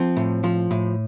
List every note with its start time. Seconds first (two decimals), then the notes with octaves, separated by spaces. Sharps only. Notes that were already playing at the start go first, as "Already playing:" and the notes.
Already playing: F3 C4
0.17 A2
0.44 F3
0.71 A2